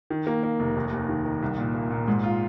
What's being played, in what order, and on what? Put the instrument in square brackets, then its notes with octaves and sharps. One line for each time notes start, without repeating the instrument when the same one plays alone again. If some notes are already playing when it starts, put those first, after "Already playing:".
[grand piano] D#3
A#3
A#3
F1
D#2
D#2
D#3
D#3
C2
A#2
A#3
A#2
G#2
F4